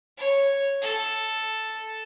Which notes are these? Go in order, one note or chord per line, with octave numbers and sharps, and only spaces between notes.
C#5
A4